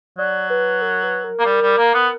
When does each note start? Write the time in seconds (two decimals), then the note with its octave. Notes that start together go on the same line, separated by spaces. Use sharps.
0.18 F#3 D5
0.50 B4
0.82 A#4
1.03 B4
1.24 A#4
1.39 A#3
1.45 G3
1.62 G3
1.78 A#3
1.94 B3